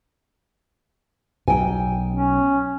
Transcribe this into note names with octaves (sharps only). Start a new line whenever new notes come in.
B1 G5 G#5
C#4